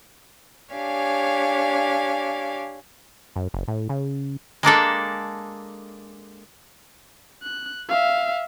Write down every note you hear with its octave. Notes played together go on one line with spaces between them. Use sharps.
D4 G4 C#5 F5 G#5
F#2
F#1
A2
C#3
G#3 A#3 D4 A4
F#6
E5 F5